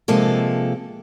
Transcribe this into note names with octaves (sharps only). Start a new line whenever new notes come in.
C3 F3 G#3 A#3 A4